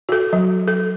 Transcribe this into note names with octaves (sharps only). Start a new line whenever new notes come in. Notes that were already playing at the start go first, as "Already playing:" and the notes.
F#4 A4
F#3
A4